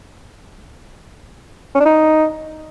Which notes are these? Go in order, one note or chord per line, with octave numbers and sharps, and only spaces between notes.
C#4
D4
D#4